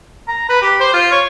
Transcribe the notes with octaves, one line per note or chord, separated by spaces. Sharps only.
A#5
B4
G4
C5
F4
C#5